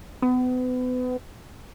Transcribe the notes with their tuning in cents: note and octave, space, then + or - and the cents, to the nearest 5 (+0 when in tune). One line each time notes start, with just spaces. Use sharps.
B3 +35